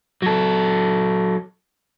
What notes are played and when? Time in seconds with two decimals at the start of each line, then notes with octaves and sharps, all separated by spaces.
0.22 F#3 A4